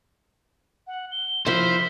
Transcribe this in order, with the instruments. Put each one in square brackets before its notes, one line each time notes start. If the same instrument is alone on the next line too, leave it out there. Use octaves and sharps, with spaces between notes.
[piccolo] F#5
G7
[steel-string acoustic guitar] F3 E4 [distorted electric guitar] C5 [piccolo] B6